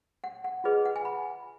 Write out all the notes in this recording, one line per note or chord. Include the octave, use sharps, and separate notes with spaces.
F#5
F#5
F4 G#4 B4 D#5
F#5
G#5
B5